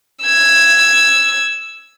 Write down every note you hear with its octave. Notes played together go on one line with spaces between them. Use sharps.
E6 G#6